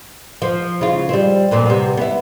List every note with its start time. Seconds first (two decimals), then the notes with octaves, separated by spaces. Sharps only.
0.42 F3
0.81 C#3 F4
1.09 G3 C4
1.51 F2 A#2 C4
1.66 C3 B3
1.97 B3 E4